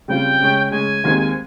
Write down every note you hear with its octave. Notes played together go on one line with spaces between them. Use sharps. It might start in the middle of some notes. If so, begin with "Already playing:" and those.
C#3 G3 C4 F4 G5
C#3 G#3 C#4
G5
C#3 G#3 C#4 G#5
D#2 D#3 G#3 C4